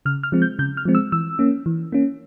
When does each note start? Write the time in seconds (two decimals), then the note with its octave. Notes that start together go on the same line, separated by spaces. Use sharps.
0.05 C#3 F6
0.23 F6
0.32 F3 G#3 C4
0.42 G6
0.59 C#3 G6
0.77 F6
0.85 F3 G#3 C4
0.95 E6
1.12 E3 E6
1.39 A#3 C#4
1.66 E3
1.92 A#3 C#4